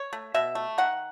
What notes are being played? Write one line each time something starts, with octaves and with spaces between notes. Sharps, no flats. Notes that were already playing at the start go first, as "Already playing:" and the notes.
Already playing: C#5
A3
B2 E5
A3
D#3 F#5